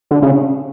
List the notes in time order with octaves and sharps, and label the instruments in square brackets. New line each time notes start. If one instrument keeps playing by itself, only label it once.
[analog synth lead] D3
C#3